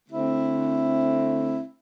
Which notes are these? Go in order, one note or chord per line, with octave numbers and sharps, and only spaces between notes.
D3 A3 C4 E4